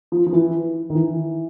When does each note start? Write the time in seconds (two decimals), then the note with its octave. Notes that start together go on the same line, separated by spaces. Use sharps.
0.12 F3
0.26 F3
0.33 E3
0.90 D#3
0.95 E3